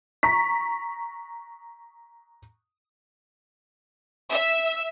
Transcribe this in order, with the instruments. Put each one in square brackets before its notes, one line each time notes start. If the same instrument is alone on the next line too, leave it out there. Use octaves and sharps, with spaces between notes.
[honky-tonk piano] A#5 C#6 B6
[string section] E5